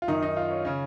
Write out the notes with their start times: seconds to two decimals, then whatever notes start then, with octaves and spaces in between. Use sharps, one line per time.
0.02 F4
0.08 F#2 D#3 D#4
0.23 D#4
0.37 F4
0.50 C#4
0.65 C#3 C#4